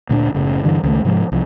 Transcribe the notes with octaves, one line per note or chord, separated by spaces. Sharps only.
D2 A#2 B3 D4
F#1 A2 C#3
G2 D3 E3
C#2 D#3 F#3 A3
G#2 C3 F3 G#3
C2 F3